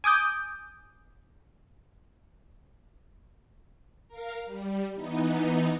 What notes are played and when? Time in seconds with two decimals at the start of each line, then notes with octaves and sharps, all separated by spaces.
0.04 G#5 D6 D#6 G6
4.08 A#4 F5
4.46 G3
4.94 E3 B3 D#4